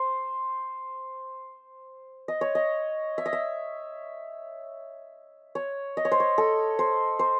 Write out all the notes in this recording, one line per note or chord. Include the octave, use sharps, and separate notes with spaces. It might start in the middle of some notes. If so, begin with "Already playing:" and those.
Already playing: C5
D#5
C#5
D#5
E5
D#5
E5
C#5
D#5
C#5
C5
C#5
A4
C5
C5